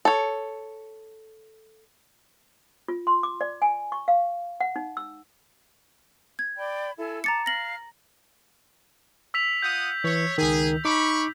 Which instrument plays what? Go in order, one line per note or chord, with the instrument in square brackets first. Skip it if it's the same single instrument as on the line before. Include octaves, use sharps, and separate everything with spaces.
[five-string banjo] A4 C#5
[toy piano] F4
C6
D6
D5
G#5
C#6
F5
F#5
D#4
E6
[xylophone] G#6
[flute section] D5 G5 B5
E4 A4 G#5
[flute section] A5 D6 [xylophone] A#5 A6 C#7
[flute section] F5 F6 [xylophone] A#6 F#7
[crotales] E6 B6 F7
[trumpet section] F4 F#5 D#6 [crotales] G6
[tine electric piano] E3 [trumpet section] C#5
[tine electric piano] C#2 D#3 [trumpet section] G#4
[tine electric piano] D#4 D6 [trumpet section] B5 C#6